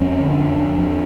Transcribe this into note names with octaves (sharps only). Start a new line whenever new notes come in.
F2 C#4
D3
D4
F2
F2
F2